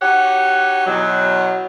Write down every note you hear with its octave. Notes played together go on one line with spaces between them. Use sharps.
D#4 F#4 G4 C#5 F#5
E2 B2 F#3